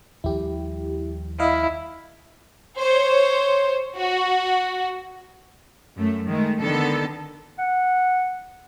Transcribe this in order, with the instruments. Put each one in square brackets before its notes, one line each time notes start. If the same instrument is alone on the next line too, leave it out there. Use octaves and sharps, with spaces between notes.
[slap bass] D#2 F3 G3 [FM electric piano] E4 G4
[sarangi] E4 [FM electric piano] D#5 F5
[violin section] C5 C#5
F#4
[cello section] F#2 A3
D#3 G#3 A3
D3 D#3 B3 A4
[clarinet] F#5